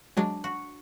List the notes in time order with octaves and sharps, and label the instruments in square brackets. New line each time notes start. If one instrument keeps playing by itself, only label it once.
[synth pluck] F#3 G#3 [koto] D4
[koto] F#4